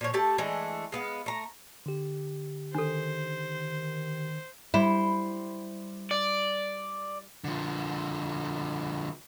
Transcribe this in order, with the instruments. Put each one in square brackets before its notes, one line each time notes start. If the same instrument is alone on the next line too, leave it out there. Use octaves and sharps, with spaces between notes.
[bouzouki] A#2 F3 C#5
A3 G4 A4 A5
E3 G#3 A3 D4
G#3 B3 F5
A3 A#5
[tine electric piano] D3 G4
[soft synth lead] D#3 [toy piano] D4 A4 [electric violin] C5
[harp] G3 C5 [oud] E4
[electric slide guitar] D5
[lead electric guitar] D3 F3